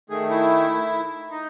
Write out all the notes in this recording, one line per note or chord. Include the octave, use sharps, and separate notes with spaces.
D#3 A3 G#4
E4
D#4